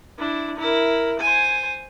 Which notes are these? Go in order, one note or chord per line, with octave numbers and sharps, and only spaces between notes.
D4 E4
E4 A#4
C5 G#5